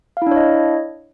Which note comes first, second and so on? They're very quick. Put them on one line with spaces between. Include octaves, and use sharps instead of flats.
F5 E4 D4 C#5 D#5